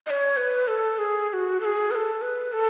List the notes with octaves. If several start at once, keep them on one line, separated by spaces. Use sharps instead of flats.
D#5
C#5
B4
A4
G#4
G#4
F#4
A4
G#4
B4
A4
B4
A4